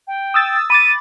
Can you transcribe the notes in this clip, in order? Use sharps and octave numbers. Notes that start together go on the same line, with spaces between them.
G5
D#6 E6 A6
B5 D6 A6 D#7